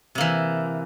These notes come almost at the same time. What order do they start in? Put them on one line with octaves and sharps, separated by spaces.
C3 A#3 E3